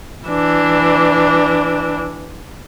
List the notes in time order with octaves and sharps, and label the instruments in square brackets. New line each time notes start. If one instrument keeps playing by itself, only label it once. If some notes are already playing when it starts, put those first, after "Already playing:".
[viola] E3 D4